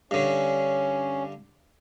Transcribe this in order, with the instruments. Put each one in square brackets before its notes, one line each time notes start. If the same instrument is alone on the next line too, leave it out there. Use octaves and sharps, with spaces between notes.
[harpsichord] G2 D3 [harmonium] C#4